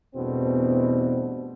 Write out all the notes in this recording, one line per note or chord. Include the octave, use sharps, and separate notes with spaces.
E2 G2 B2 A3 C4 D4